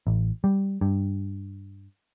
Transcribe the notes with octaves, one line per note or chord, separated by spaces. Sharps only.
A1
G3
G2